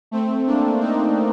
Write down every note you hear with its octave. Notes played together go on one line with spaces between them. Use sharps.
A3 C4
A#3 D4
C4 D#4